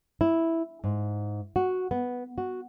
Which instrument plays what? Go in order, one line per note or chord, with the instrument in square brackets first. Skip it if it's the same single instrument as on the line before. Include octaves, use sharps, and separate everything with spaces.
[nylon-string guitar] E4
G#2
F#4
B3
F#4